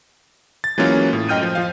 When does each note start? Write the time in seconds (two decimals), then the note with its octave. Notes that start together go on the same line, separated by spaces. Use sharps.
0.64 A6
0.78 E3 F#3 G#3 A#3 C#4 F4
1.13 A2
1.29 F#2 D#5 G5 F6 G6 D#7
1.43 F3
1.55 F3 F5